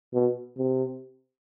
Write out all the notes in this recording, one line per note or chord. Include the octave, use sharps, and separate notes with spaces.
B2
C3